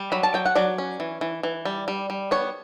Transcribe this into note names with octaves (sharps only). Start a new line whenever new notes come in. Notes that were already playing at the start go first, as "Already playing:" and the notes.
Already playing: G3
F#3 B5
A5
F#3 G5
F#5
F#3 D5
C#4
E3
E3
E3
G3
G3
G3
B3 C#5